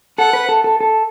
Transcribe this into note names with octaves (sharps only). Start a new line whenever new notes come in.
A4 F#5
B4
A4
A4
A4